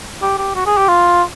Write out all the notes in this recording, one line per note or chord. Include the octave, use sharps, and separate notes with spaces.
G4
G4
F#4
G#4
G4
F4